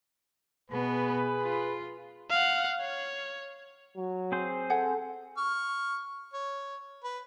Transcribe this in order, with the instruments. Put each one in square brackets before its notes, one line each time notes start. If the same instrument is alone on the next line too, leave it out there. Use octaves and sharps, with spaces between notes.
[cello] B2 B3 [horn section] G#4 B4
[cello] F4
[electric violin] F5 F#5
C#5
[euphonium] F#3
[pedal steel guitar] C4 G#4 C5
[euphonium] A4 [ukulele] F#5 G#5
[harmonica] C#6 F6
C#5
B4